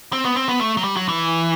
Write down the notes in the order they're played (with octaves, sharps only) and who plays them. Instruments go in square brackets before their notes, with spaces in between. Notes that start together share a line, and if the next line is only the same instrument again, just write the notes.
[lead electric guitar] C4
B3
C4
B3
A3
F#3
G3
F#3
E3